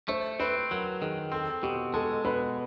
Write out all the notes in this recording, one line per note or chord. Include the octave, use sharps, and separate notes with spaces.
A3 C5
C4 B4
F#3 A#4
D#3 G#4
C4 A4
B2 G4
G#3 A4
B2 B4